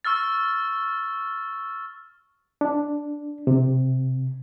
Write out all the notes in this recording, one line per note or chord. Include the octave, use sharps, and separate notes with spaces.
C#6 E6 F6 A6
D4
C3